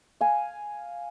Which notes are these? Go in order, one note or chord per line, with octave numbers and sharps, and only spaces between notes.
F5 G#5